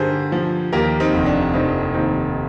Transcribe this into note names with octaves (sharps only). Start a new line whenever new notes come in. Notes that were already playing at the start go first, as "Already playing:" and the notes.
Already playing: G2 D3 G4 G#4 A#4 C5
F3
D#2 G4 A#4
C4 D#4
F1
D4
F1 C4 D#4
D#2 C4 D#4